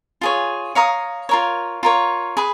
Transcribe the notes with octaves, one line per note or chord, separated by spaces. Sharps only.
F4 G#4 C#5
C#5 F5 A#5 D#6
F4 A#4 C#5
F4 A#4 C#5
G#4 B4